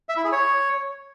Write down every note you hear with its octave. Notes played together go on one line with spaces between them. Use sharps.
E5
E4
G#4
C#5